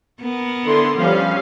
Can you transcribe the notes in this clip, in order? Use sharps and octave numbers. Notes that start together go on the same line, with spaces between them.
B3 A#4
D3 E4 C6
F3 G3 C#4 F5